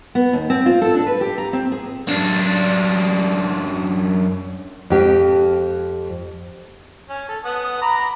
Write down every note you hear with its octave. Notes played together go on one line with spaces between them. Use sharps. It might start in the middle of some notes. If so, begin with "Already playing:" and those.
B3
D#2
C4
F4
A4
D4
B4
G4
A#5
C4
G#4
F#2 D4
F2 G4
C#4
A4
B3 F#5 D#6
A#5 B5 D6